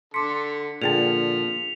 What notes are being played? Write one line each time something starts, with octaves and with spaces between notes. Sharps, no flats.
D3 A4 C6 D6 B6 C#7
A#2 D3 F3 G#4 G5 A5 F7